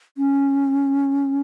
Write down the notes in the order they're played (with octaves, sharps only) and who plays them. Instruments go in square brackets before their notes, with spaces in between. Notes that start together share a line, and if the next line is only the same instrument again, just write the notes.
[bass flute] C#4